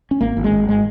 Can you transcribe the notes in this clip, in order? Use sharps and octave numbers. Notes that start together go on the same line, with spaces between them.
C#4
G#1 A#3
G#1
G#3
G#1
G#3